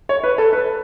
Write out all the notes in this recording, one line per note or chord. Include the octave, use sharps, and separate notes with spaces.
C#5
B4
A4
B4